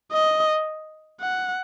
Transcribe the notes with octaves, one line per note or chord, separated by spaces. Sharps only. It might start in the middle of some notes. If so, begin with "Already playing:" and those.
D#5
F#5